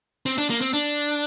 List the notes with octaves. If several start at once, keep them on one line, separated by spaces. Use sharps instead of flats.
C4
D4
A#3
C4
D4